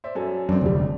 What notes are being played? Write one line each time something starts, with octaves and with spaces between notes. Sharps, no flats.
C5 D5 E5
F#2 A4 G#5
F#2 C4 D4
F1 D2 G3 D4